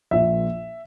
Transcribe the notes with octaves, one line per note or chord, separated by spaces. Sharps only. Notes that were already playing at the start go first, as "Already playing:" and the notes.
A#1 A#2 E5